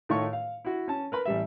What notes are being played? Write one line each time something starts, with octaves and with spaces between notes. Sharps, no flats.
A2 D#3 A3 F4 C#5 C#6
F5
E4 F#4
C#4 A5
A#4 B4 B5
A1 G3 E5